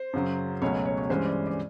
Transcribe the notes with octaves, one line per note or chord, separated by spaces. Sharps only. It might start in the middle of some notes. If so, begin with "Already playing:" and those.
Already playing: C5
F#2 C#3 F#3
C#2 B2 F#3 A3 C#4 C#5
C#5
C#5
G2 E3 G#3 C#4 C5
D5
D5